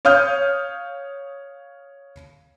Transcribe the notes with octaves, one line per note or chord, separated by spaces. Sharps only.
C#5 F5 D#6 F6 G6